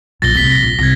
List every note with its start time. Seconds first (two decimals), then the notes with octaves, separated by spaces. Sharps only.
0.22 A#1 A#2 A6 A#6 G7
0.35 D1 C2 B6 G7
0.48 A#6 B6 G7
0.62 A#1
0.79 C2 G#6 A#6